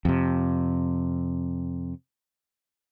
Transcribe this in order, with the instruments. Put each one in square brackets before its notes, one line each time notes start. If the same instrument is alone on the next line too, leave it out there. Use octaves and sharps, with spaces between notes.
[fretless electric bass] F2 C3